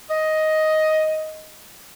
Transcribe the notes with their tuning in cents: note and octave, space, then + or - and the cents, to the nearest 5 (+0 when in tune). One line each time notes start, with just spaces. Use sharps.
D#5 +5